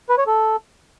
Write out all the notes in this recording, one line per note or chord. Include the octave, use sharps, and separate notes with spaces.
B4
C#5
A4